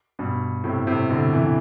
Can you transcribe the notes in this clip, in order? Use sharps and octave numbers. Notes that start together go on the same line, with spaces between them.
G2 B2
A2 C3
A2 C3
B2 D3
C3 E3